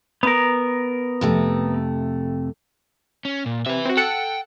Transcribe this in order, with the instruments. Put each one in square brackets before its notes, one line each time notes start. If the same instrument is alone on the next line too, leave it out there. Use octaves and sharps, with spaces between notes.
[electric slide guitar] B3 A#4
[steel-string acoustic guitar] F2 C3 A3
[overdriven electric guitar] C#4
A#2
[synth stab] C3 [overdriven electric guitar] B4 E5
[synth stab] C4 F#4
[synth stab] A4 F#5 C#7 [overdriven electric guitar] G5